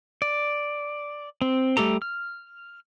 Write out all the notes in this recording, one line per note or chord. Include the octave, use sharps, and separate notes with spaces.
D5
C4
G3 A3 G4 A4 A#5
F6